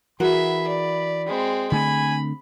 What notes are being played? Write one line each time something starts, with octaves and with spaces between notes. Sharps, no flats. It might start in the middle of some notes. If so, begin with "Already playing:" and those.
E3 F#4 G#4 A#4 E5 B5
D5
G#3 C4
D3 A3 C4 G#5 B5